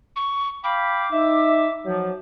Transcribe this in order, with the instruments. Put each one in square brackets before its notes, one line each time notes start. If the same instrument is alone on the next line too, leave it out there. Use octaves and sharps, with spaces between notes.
[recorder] C#6
[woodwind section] F5 G5 B5 [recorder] D6
[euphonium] D#4 [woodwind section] E5
[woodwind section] F3 [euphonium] F#3